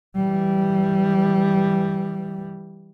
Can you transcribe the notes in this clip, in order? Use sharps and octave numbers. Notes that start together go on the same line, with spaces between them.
E3 G3